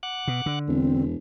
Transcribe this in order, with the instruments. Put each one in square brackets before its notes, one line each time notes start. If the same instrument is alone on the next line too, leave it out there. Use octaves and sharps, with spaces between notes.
[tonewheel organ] F#5 D6 F#6
[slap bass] B2
D3
[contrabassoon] E1 [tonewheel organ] E2 [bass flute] C4